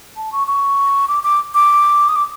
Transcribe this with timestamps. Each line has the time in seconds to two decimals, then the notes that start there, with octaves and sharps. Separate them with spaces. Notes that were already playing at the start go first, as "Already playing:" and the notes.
0.17 A5
0.32 C#6
0.47 C#6
1.08 D6
1.23 D6
1.54 D6
2.09 D#6
2.16 D6